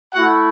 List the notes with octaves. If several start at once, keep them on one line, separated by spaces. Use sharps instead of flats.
A3 E4 F#4 F#5